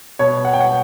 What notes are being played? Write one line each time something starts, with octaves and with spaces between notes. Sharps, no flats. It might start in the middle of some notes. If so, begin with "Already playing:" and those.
B2 C#5
F#5
G5
F#5